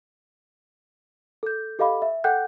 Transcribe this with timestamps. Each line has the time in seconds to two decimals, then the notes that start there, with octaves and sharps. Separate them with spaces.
1.43 A4 G6
1.79 G4 A4 D#5 F5 B5 D6
2.02 E5
2.24 A4 F#5 G5 F#6 G6